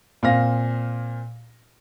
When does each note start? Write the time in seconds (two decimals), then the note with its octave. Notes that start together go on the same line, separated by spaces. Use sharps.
0.23 A#2 C4 F5 A#6